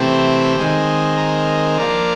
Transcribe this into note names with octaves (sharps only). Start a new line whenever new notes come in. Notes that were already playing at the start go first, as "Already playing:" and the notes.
Already playing: C3 E3 A3 C4 G4
D#3 G#3 C4
A#4
F3 A#3 D4